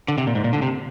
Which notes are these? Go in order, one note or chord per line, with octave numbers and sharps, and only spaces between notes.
D3
C3
A#2
G#2
A#2
D3
C3